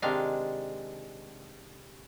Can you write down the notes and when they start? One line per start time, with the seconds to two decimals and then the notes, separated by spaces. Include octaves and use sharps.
0.02 C3 D#3 G#3 D4 F5